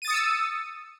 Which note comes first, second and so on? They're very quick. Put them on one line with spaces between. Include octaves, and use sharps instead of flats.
D#7 A6 D#6 C#7 E6